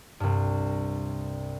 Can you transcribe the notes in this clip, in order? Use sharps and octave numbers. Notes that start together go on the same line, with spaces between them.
C2 G2